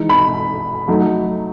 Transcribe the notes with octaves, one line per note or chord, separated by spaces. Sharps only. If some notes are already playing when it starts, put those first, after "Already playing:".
Already playing: E3 G#3 D#4
B5
F#3 A3 D#4